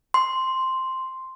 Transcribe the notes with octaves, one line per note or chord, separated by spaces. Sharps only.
C6